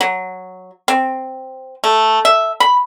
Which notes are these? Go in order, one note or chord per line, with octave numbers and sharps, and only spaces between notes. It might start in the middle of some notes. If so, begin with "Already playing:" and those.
F#3
C4
A3
E5
B5